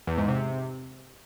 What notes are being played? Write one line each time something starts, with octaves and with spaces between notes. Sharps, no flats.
E2
G#2
C3